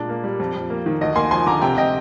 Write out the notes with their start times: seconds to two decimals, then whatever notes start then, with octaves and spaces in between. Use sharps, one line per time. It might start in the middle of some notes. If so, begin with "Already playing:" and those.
Already playing: A#2 G#3 D4
0.09 A#3
0.24 G3
0.40 F2
0.55 F2
0.70 A#3
0.86 D#3
1.01 D2 D#5
1.16 A#3 G#5 C6
1.31 F3 G#5 C6
1.46 D3 A#5 D6
1.61 C3 G5 A#5
1.77 C3 D#5 G5